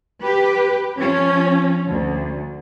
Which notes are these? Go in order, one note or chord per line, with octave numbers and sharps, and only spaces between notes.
G4 B4
F3 C#4
D2